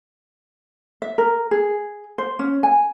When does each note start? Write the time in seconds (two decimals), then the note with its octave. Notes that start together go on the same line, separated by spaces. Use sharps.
1.02 E5
1.18 A#4
1.51 G#4
2.18 C5
2.39 C#4
2.63 G#5